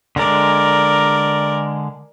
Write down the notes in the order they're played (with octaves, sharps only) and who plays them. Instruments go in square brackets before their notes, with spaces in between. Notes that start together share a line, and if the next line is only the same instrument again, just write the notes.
[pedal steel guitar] D3 G#3 [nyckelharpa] A#4 D5